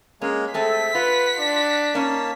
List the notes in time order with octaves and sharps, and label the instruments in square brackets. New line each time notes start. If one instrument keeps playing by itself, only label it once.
[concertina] G#3 A#3 [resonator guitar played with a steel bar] C#4
[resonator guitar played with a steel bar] G#3 A3 C4 [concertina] A4 [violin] B6
[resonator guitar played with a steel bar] F4 [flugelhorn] B4 [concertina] F#5
[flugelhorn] D4
[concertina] A#3 A5 [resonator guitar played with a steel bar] C#4 D#4